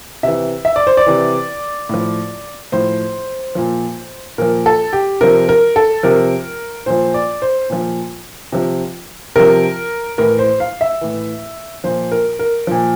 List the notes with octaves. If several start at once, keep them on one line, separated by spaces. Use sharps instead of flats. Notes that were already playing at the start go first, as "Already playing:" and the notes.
C3 E3 E5
E5
D5
C5
D5
C3 E3
A2 F3
A2 F3 C5
A#2 F3
A#2 F3 A#4
A4
G4
C3 F3 A#4
A#4
A4
C3 F3 A#4
A#2 F3 C5
D5
C5
A#2 F3
C3 F3
C3 F3 A#4
A2 E3 A#4
C5
F5
E5
A2 E3
A#2 F3 C5
A#4
A#4
A#2 F3